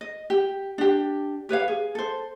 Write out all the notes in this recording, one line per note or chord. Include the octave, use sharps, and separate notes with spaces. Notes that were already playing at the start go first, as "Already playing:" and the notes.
D#5
G4
D4 G4
G4 B4 C#5 F5
G#4
A4 C5